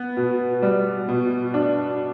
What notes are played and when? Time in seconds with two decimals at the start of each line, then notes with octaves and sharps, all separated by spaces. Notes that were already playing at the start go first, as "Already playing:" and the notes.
Already playing: B3
0.17 B2
0.62 G3
1.09 B2
1.54 D4